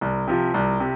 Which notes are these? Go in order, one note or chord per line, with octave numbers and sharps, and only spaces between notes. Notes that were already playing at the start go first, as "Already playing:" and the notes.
C2
C3 F3
C2
C3